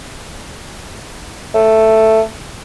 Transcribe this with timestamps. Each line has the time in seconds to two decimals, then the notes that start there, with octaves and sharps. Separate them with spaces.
1.55 A3